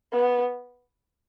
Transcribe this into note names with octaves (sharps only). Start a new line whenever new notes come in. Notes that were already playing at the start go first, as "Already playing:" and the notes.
B3